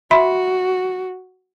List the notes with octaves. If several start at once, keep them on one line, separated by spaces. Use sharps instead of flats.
F#4 E5 B5 C6